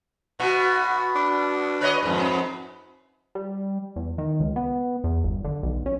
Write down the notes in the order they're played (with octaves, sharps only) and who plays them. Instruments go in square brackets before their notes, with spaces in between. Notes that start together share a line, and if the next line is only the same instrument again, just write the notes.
[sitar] B2 [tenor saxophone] F#4
[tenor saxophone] D4
[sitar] B4 C#5 D#5
F2 G#2
[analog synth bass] G3
E2
D#3
C#2
B3
E2
G1
D3
B1
C#4